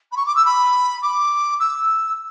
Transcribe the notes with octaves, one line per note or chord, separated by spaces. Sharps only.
B5
C#6
D6
E6
B5
D6
E6